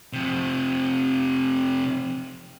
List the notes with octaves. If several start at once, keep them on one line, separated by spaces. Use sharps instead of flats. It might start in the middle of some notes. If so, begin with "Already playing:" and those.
F2 C3